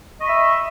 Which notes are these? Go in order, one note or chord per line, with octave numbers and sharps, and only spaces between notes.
D#5 E5 B5 C#6